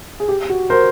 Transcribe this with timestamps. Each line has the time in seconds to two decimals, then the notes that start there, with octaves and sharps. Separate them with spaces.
0.20 G#4
0.28 G4
0.50 F#4
0.70 A#4 C5